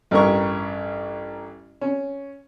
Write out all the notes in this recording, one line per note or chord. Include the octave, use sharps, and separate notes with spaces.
A1 G2 A#4 C#6
C#4